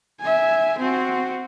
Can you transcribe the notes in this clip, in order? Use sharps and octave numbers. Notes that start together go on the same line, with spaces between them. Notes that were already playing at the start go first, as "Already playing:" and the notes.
E5 G#5
C4 F#4